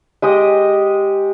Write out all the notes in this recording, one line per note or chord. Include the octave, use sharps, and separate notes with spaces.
G#3 G4 D#5